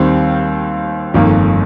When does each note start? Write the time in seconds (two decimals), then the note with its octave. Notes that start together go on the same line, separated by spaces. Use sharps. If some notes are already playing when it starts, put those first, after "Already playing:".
Already playing: D#2 D#3 G3 C4
1.14 G1 F2 D#3 A#3